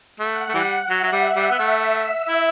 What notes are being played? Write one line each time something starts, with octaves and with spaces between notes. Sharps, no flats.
A3 F#5
A3
E3 G3
F#3 E5
F#3
G3
F#5
G3
B3
A3 E5
E4